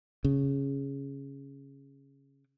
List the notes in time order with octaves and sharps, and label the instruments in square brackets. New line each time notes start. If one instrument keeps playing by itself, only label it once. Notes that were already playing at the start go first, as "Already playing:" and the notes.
[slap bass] C#3